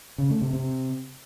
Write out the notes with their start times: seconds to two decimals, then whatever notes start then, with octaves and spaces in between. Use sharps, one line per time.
0.18 C#3
0.30 A3
0.42 C3
0.53 C3